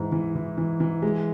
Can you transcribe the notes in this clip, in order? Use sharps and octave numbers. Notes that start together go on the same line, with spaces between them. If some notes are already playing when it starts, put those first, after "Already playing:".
Already playing: G#2 E3
E3
E3
E3
E3
G#3